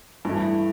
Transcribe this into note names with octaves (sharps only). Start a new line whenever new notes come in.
G2 E3 A3 E4